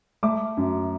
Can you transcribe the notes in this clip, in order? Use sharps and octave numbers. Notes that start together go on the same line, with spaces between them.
A3 D6
F#2